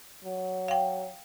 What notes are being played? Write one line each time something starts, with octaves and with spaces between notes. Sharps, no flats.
F#3
F5 G5